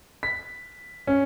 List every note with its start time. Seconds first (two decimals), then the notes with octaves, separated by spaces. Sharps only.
0.23 B6
1.07 C#4